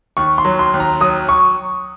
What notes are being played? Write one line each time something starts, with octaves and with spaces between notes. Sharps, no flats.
D#2 C#6
C6
F#3
C6
D#2
A#5
F#3 D#6
C#6